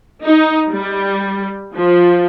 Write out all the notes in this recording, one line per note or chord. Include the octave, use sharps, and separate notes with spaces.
D#4
G3
F3